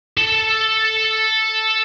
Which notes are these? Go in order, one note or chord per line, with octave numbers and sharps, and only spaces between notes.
A4 A5